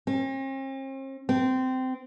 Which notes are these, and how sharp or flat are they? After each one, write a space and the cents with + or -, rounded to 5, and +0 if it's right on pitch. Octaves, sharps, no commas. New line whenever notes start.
C4 +45
C4 -20